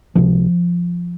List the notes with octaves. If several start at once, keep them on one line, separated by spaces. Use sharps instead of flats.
C#2 C3 F3